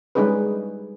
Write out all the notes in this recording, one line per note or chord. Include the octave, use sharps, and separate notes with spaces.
G3 G#3 C#4 D#4 G#4 B4